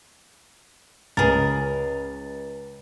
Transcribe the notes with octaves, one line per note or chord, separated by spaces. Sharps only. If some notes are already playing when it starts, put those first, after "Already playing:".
C#2 G#4 A#4 A6